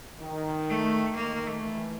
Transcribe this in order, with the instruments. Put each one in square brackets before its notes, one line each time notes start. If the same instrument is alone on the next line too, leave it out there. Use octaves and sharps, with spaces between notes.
[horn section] D#3
[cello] A3
[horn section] D#3 [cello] A#3
[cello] A3
[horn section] E3